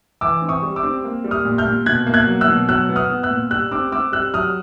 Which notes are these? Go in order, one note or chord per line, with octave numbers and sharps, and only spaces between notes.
E3 D6 E6
C4
C#6 D#6
G3
D6 E6
C4
A#3
G3
D#6 F6
A#2
F6 G6
A#2
B2 F#6 G#6
A#3
F#6 G#6
F#3
E6 F#6
B2
F#3 E6 F#6
B3
D#6 F6
B3
E6 F#6
A#2
G3 E6 F#6
C4 D6 E6
C4 D6 E6
G3 E6 F#6
F#3 D#6 F6